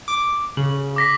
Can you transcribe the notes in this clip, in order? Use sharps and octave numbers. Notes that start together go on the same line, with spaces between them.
D6
C#3 F#7
D6 A#6 B6